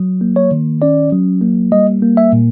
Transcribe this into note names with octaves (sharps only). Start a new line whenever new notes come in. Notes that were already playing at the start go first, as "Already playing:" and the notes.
Already playing: F#3
A#3
C#5
D#3
C#4 D5
F#3
A#3
G3 D#5
A#3
E5
A#2